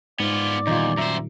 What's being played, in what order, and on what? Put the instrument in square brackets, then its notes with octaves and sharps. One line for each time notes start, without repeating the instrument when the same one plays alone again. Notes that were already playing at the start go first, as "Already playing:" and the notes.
[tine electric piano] G#2 [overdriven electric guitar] B3 F4 [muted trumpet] D5
[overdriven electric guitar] E2 [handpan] A#2 D#3 G3 [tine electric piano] D#4 F4
[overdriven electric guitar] F#2 C5 [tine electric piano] E5 A#5